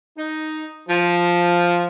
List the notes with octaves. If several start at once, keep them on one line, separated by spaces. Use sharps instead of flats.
D#4
F3